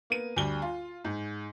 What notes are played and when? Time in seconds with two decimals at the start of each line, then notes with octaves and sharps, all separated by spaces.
0.10 A#3 B3 D#7
0.36 D2 G3 G7
0.62 F4
1.04 G#2